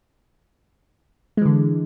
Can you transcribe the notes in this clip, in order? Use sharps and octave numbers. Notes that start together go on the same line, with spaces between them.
D3 E3 G#3